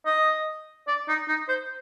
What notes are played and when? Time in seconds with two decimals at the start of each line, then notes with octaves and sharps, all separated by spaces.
0.06 D#5
0.87 D5
1.08 D#4
1.28 D#4
1.48 C5